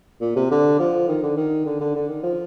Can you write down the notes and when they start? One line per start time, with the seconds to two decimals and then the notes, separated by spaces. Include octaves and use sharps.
0.21 A#2
0.36 C3
0.51 D3
0.79 F3
1.08 D#3
1.23 D3
1.37 D#3
1.66 D3
1.80 D3
1.95 D3
2.09 D#3
2.23 F3